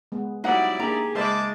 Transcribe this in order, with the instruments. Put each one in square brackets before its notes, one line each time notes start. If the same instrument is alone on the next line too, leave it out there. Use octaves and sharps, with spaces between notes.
[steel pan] G#3 B3
[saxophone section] F#3 G3 F#4 [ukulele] D#4 F#5 [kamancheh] E4 D5
[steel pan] A#3 D#4 [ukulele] D4 A#5 [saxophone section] G4 G#4
[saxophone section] C#3 G#3 [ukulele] C5 [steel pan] E5 B5 [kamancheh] A5 D6